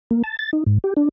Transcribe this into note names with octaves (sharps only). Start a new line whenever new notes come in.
A#3
A5
A6
D#4
G#2
G4
D4